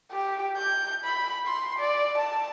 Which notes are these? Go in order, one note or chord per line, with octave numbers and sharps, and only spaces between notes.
G4
G6
B5
C6
D5
A5